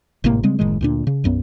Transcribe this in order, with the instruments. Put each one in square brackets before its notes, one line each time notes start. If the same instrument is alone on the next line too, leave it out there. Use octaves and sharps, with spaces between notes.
[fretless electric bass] G#1 A2 C3 A#3
C#3 G3 G#3 C4
F#1 A2 D#3 G#3
D2 A#2 D4
C#3
B1 F#2 B3